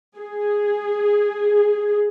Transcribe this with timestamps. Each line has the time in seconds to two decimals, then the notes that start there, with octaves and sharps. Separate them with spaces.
0.17 G#4